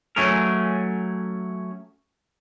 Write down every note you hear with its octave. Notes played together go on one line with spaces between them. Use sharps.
F#3 A3 C#4 G#4 A#4